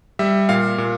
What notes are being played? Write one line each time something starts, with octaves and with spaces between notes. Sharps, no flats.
G3 E5
A#2 F5
A#2